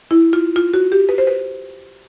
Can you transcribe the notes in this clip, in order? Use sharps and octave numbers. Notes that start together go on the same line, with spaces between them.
E4
F4
F4
F#4
G4
B4
C5
B4